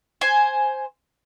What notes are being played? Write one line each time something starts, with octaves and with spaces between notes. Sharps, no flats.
C5 G#5